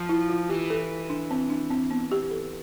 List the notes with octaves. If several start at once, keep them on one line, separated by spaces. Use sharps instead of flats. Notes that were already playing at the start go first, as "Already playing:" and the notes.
Already playing: F3
E4
F4
E3 G4
A4
D4
C4
D4
C4
B3
G4
A4